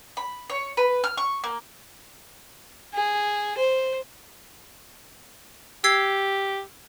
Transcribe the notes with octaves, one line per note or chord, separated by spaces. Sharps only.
B5
C#5
B4
F6
C#6
A#3
G#4
C5
G4 E6 G#6 C7